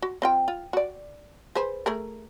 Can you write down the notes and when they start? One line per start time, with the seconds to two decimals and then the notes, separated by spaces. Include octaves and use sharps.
0.02 F#4
0.22 C4 F4 G5
0.48 F4
0.73 F#4 D5
1.55 G#4 B4 C5
1.86 A3 G#4 A#4